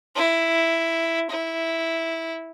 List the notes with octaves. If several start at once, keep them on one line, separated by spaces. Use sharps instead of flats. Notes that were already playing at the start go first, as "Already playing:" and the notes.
E4
E4